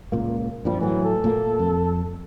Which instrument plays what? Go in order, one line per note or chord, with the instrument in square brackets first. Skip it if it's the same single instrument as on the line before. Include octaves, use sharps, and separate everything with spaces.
[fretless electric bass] C#2 A#2 A#3
[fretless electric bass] G2 A#2 F3 [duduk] G3
[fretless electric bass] A2 F#3 [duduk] E3
[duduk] A4
[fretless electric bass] A#2 A3 A#3
F2